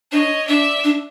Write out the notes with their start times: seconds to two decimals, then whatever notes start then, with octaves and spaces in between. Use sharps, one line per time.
0.12 D4 C#5 D#5
0.47 D4 D5 E5
0.84 D4